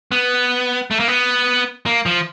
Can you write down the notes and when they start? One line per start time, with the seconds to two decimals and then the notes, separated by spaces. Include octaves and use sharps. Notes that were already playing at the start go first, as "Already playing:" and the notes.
0.12 B3
0.91 A3
1.00 A#3
1.08 B3
1.86 A#3
2.06 F3